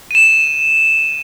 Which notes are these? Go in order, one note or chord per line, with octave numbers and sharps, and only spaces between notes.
D#7 E7